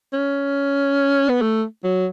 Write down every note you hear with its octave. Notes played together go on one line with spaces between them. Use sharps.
C#4
B3
A3
F#3